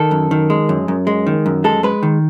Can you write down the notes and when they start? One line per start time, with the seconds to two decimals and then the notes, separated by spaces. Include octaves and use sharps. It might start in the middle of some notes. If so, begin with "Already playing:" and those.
Already playing: D#3 A4
0.11 F#2
0.31 D#3
0.50 G#3
0.69 F#2
0.88 F#2
1.07 G#3
1.27 D#3
1.46 F#2
1.64 G#3 A4
1.83 G#3 B4
2.03 D#3